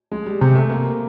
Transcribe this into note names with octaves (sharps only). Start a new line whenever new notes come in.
G#3
G3
C3 G3
A3
A#3